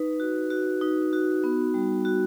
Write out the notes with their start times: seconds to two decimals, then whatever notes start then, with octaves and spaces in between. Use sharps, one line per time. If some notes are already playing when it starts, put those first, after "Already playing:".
Already playing: D#4 B4
0.20 F#4
0.50 F#4
0.81 D#4
1.13 F#4
1.44 B3
1.74 G3
2.05 F#4